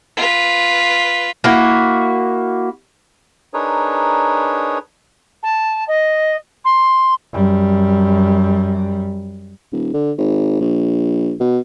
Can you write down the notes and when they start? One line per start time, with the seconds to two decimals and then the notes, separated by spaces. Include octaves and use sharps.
0.17 F4 B4
1.44 A#3 E4 F#4
3.54 D4 D#4 G#4 A#4 B4 C#5
5.42 A5
5.87 D#5
6.64 C6
7.33 F#2 G3
9.72 D#1
9.94 D3
10.18 G#1
10.61 A#1
11.40 B2